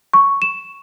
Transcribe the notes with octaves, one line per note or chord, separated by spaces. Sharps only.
C#6
E7